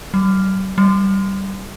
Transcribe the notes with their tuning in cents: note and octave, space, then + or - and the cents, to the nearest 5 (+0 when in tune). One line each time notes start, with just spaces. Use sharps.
G3 -45
G3 -15